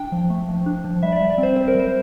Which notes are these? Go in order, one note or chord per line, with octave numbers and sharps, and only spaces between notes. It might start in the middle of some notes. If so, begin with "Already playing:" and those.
Already playing: D4 G5
F3
A3
F3
D4
F3
G3 E5
D5
G3 E5
D5
C4
C5
C4 C5
A#4
G3 C5